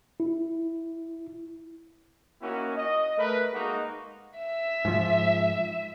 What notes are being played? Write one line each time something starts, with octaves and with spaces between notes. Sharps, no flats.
E4
A#3 C#4 D#4 E4 F#4
D#5
A3 A#4 B4
G#3 A#3 D#4 F#4
E5 E6
G#2 F3